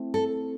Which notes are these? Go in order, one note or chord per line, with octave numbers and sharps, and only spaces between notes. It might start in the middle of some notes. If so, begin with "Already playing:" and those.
Already playing: A3 C4 E4
A4